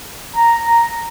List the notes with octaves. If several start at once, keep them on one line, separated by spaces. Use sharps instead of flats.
A#5
A#5